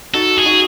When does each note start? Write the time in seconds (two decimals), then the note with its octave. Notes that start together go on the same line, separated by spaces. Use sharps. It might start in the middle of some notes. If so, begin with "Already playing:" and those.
0.14 D#4 F#4 A4
0.38 G#4
0.45 D#4 F#4